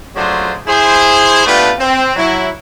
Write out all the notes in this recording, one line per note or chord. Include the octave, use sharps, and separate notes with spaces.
C#3 F#3 A3 D4 F4 C5
E4 G#4 C5
A3 B3 D4 F4 G4 B4
C4
F#3 E4